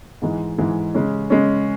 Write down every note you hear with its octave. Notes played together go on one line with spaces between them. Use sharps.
G#2 E3 G#3
G#2 E3 G#3
C#3 G#3 C#4
C#3 G#3 C#4